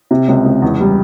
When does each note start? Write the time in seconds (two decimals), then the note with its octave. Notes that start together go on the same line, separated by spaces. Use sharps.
0.11 C3
0.28 C#2
0.46 C#2
0.62 E2
0.80 G3